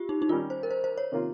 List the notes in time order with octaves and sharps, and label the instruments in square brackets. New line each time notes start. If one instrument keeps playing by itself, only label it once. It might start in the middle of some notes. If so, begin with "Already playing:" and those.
Already playing: [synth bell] F4 G4
D#4
D#4
[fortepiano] D#3 G3 C#4 [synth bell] F4
[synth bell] C5
A#4
C5
C5
C#5
[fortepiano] C3 D#3 A#3 F4